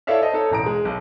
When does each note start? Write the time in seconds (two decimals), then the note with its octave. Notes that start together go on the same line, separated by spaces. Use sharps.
0.07 E4 A4 C#5 D5 E5 F5
0.22 C5 D#5 A5
0.33 D#4 A4 C#5
0.50 E1 A1 A#5 D7
0.66 G#3
0.85 B1